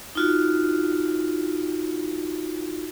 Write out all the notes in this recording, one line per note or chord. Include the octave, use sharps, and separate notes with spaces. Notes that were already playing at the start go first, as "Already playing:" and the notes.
D#4 F4 F#4